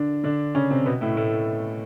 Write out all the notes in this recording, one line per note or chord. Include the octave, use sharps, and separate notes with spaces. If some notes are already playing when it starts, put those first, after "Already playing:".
Already playing: D3 D4
D3 D4
C#3 C#4
C3 C4
B2 B3
A2 A3
A2 A3